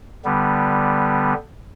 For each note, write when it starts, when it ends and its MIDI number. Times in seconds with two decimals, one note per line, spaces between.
0.25 1.34 50
0.25 1.34 55
0.25 1.34 59